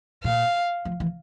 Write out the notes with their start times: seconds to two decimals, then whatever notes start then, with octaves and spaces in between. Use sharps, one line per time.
0.24 A#2 F5
0.85 F3
1.00 E3